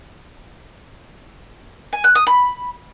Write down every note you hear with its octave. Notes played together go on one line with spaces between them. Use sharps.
G#5
F#6
D#6
B5